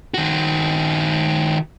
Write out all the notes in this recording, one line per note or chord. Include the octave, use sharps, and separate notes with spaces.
D#3 F#4